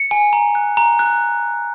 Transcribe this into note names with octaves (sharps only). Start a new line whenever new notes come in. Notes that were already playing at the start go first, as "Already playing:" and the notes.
Already playing: C#7
G#5
A#5
F#6
A#5
F#6